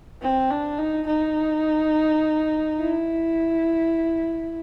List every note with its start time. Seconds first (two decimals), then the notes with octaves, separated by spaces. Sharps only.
0.22 C4
0.51 D4
0.79 D#4
1.07 D#4
2.80 E4